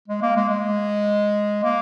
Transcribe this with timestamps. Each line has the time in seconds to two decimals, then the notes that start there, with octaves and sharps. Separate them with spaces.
0.08 G#3
0.22 A#3
0.36 G#3
0.49 G#3
1.63 A#3